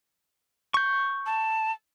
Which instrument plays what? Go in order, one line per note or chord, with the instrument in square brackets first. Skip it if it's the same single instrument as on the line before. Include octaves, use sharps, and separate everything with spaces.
[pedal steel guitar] C#6 G6
[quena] A5